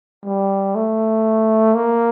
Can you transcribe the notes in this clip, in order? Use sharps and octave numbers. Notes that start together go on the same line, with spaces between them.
G3
A3
A#3